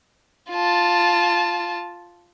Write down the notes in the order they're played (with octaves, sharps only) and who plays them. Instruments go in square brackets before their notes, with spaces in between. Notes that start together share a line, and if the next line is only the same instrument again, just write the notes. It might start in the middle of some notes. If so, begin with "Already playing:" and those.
[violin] F4 A5